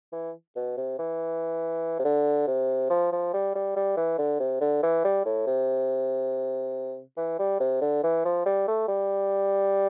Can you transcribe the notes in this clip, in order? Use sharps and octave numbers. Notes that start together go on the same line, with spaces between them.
E3
B2
C3
E3
C3
D3
C3
F3
F3
G3
G3
G3
E3
D3
C3
D3
E3
G3
A2
C3
E3
G3
C3
D3
E3
F3
G3
A3
G3